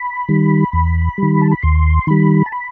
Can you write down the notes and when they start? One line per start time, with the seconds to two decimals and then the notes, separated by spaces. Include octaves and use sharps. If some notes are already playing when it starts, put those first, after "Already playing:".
Already playing: B5
0.29 D#3 G3
0.73 E2
1.18 D#3 G3
1.42 A5
1.51 B5
1.62 D#2 C6
2.07 D#3 G3 B5
2.46 A5
2.52 B5